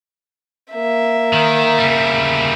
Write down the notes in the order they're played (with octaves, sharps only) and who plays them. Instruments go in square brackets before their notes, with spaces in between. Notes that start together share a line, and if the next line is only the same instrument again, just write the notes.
[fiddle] A#3 E5
[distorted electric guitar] D#3
C#3 G3